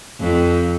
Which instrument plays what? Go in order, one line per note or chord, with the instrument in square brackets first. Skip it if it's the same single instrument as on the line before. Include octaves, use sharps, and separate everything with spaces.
[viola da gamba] F2